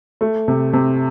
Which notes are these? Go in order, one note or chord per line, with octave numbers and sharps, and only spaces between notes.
A3
C3
C3